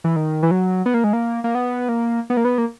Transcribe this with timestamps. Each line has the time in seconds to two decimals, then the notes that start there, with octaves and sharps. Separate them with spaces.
0.04 E3
0.16 D#3
0.43 E3
0.51 F#3
0.86 B3
0.94 A#3
1.04 G#3
1.13 A#3
1.44 A#3
1.55 B3
1.89 A#3
2.30 B3
2.37 A#3
2.45 B3
2.58 A#3